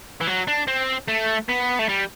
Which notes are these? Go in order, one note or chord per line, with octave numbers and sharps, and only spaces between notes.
E3
F#3
D4
C4
A3
B3
A3
G3